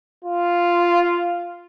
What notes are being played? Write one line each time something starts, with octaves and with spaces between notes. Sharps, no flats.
F4